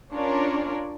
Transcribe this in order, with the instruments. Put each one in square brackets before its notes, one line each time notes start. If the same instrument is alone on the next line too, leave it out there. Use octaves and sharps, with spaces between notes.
[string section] C#4 D4 F4 A#4 C#5 D5